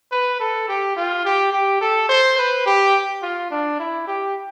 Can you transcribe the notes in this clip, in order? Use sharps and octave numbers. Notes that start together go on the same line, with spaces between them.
B4
A4
G4
F4
G4
G4
A4
C5
B4
G4
F4
D4
E4
G4